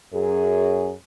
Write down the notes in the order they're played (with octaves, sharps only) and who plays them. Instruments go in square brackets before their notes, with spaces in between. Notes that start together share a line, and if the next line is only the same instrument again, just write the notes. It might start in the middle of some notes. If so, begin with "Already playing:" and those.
[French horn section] F#2 G#4